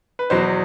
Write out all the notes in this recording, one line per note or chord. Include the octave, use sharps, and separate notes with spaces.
B4
E2 B2 F#3 C5